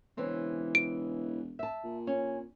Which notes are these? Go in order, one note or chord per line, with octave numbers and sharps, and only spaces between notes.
E1 C#3 E3 C4
D7
E5 A5
A#2
C#4